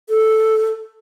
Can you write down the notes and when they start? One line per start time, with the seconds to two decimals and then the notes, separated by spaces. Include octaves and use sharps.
0.09 A4